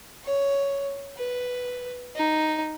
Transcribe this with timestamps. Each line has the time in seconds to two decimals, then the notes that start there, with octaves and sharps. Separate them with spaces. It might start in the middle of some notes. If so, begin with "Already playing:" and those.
0.24 C#5
1.17 B4
2.16 D#4